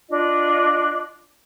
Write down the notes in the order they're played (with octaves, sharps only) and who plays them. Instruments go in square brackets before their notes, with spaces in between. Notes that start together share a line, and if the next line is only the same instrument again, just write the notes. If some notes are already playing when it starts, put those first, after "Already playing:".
[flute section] D4 F4 D#5